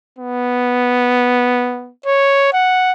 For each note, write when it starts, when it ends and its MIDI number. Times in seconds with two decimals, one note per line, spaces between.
0.18 1.91 59
2.06 2.49 73
2.53 2.92 78